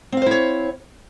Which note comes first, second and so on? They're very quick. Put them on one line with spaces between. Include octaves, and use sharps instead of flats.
C4 F5 C5 E4 C#5